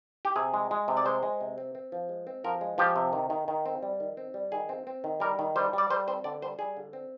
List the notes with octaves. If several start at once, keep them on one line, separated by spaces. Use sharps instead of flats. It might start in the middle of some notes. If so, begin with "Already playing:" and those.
G4
C3 G#4
G#3
G#3
C3
D5
G#3 C5
G#3
C3
C4
C4
F3
G#3
C4
F3 A#4
G#3
F3 G4
C3
D#3
D#3
D#3
C4
G3
D#3
C4
G3
D#3 G#4
C4
C4
D#3
G3 A#4
D#3
G3 C5
G3 D5
G3 C5
C4 C5
D3 D5
G3 C5
G3 G#4
D3
C4